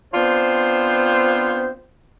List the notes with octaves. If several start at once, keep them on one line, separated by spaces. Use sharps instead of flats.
B3 C4 D4 F4 C5